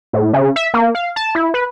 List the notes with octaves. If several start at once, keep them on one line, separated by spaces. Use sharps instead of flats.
A2
C#3
E5
A#3
F5
A5
E4
B4